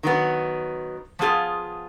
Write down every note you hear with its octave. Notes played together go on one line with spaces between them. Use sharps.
D#3 F#3 B3
F3 B3 F4 G#4